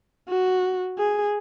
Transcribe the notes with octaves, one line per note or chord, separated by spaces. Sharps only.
F#4
G#4